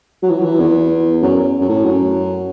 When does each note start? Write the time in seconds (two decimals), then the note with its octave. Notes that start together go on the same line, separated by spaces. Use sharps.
0.23 F#3
0.30 E3
0.39 F#3
0.45 E3
0.60 E2
1.22 F#2
1.61 F#2
1.69 A2
1.84 F#2